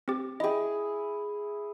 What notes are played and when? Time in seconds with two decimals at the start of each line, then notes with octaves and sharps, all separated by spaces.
0.08 C4 G4
0.40 E4 G#4 D#5 G5